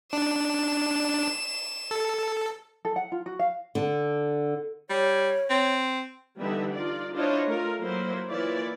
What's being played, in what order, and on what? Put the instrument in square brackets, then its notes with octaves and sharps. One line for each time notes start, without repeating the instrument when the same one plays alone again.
[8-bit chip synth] D4 [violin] E7
[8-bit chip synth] A4
[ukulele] A4
F#5
F4
F#4
F5
[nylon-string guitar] D3
[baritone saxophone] G3 [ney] C#5
[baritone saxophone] C4
[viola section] D3 E3 G3 B3 D#4 E5
D#4 F4 D5
D4 E4 F4 C5 C#5 D#5
A3 F4 A#4
F#3 A#3 E4 C5
E3 A#3 E4 F4 C#5 D5